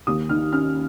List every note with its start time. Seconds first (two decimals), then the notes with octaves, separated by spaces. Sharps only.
0.07 D#2 D#6
0.29 D#3 F6
0.52 C#4 F6